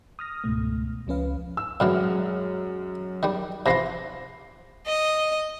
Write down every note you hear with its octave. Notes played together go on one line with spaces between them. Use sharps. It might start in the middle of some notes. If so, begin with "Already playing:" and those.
D#6 F6 A#6
C#2 G#2 B2 A3
C#2 F3 C#4 B4 F5
E6
F#2 A2 D3 E3 G#3 F6
D#3 G3
C3 E3 F4 B5 A#6 C7
D#5